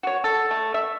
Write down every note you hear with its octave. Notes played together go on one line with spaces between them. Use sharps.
F#4 C#5
A4
A3
E5